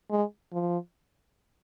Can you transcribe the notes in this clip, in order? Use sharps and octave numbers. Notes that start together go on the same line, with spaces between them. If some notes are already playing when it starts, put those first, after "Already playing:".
G#3
F3